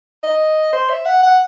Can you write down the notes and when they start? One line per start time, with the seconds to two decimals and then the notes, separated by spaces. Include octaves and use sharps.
0.24 D#5
0.73 C5
0.90 E5
1.06 F#5
1.23 F#5